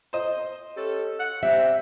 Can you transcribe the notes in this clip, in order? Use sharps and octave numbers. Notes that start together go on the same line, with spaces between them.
C5 D#5
C#4 G4 A4
F#5
G3 C4 E5